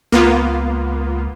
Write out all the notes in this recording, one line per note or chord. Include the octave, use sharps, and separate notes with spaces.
C#2 A#3 B3 F4